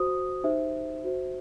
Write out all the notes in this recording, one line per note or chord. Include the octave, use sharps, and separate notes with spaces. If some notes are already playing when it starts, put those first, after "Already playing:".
Already playing: F#4 C5 D#6
D#4 G4 C5 E5
F#4 C5